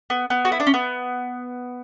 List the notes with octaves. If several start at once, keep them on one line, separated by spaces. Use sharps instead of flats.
B3
B3
F#4
E4
D4
C#4
B3